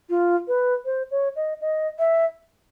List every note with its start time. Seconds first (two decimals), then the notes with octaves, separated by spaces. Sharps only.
0.10 F4
0.48 B4
0.85 C5
1.11 C#5
1.36 D#5
1.61 D#5
1.99 E5